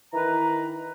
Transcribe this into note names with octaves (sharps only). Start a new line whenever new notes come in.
D#3 E3 B4 A#5